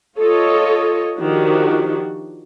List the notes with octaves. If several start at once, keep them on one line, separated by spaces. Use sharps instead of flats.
F4 A4 C#5 D#5
D#3 F3 D4 F#4 G4